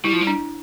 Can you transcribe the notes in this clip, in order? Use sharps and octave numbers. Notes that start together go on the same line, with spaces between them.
G3 E4
F3
G3
D4